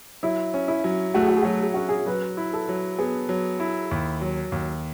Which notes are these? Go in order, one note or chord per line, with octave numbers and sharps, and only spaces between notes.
F#3 E4
C#4
E4
F#3
A3 F#4
G#4
F#4
G#4
F#3 F#4
G#4
C#4 F#4
G#4
F#3 B4
E4
A4
F#3
B3 G#4
F#3
E4
D#2
F#3
D#2